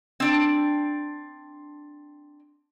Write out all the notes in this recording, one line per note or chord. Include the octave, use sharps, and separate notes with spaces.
C4 D4 D5